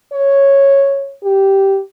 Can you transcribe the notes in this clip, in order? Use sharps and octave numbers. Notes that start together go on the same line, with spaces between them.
C#5
G4